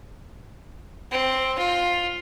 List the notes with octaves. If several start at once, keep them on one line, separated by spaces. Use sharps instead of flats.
C4
F4